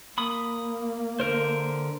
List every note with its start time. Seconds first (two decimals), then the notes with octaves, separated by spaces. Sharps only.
0.18 A#3 B5 D#6
1.20 D3 A#4 C5